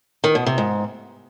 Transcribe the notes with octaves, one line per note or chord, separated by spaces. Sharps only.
D#3
B2
C3
G#2